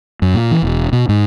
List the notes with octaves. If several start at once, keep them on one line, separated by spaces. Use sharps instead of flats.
F#2
A#2
E3
E1
B2
G#2